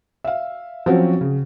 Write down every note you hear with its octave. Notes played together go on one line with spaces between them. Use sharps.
E5 F5
F3 F#3 C4 C#4 F#4
C#3